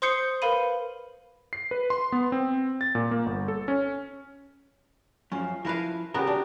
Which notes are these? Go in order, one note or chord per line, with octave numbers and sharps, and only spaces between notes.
C5 C6 D#6 G6 C7 C#7
A#4 B4 F5 B5 D#7
C7
B4
C6
B3
C4
A6
A#2
A#3
G1
A4
C#4
F#2 F3 C#4
F3 E4 A#4 B4 F5
C#3 B3 F#4 G4 A#4
D4